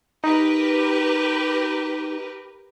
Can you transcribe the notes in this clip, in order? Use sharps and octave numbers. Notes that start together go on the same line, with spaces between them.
D#4 G4 A#4 B4